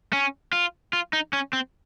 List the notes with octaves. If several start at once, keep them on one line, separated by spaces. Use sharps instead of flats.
C#4
F4
F4
D#4
C#4
C4